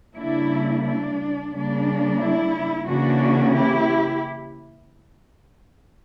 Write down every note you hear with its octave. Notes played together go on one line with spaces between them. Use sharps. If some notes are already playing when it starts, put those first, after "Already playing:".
C#3 G3 A#3 D4 E4
D4
C#3 G3 A#3 D4
E4
C#3 E3 A#3 C#4 D4 F#4
E4 G4